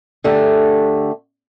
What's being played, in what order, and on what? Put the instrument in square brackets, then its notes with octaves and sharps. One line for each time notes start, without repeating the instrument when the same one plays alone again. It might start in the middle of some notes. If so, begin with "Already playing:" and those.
[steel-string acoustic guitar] D3 A3 G4